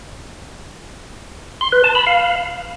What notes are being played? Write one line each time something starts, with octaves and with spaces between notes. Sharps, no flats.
C6
B4
A5
B5
F5